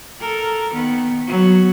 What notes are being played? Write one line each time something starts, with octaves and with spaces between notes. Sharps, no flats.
A4 A#4
D#3 B3
F#3 B3